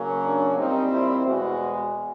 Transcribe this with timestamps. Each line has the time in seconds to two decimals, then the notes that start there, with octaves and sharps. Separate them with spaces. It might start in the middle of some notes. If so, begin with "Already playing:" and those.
Already playing: C#3 F#3 A#3 C#4
0.24 D4
0.58 A#2 G3 C4 D#4
0.91 E4
1.25 E2 B2 G#3 F#4